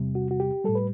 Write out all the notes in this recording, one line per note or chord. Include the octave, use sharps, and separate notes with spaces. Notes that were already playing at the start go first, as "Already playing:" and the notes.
Already playing: E2 C3 G3
F#4
F#4
G4
A2 G3 A4
B4